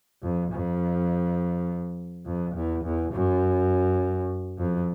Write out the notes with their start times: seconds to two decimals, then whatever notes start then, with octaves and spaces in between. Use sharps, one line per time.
0.23 F2
0.52 F2
2.26 F2
2.55 E2
2.84 E2
3.13 F#2
4.59 F2